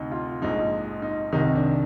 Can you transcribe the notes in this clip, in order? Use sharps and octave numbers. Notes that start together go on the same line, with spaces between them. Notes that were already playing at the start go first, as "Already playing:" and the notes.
Already playing: D2 C3 D#4
F4
A#1 G#2 F3 D#4
D#4
C2 C3 D#3 D#4
D4